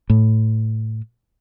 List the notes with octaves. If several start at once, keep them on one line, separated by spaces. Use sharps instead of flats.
A2